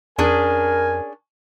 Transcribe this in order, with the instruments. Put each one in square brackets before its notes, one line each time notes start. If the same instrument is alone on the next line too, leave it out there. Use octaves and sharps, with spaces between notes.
[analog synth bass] F2 [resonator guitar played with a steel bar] C#4 D4 G#4 [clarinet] A#4 [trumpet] G#5